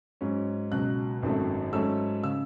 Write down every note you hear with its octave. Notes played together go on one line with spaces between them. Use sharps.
G#2 F#3 C#4
C#2 B2 F#3 F#6
G#1 F#2 D#3 F#3 A3
G#2 F#3 A3 C#4 E6
C#3 E6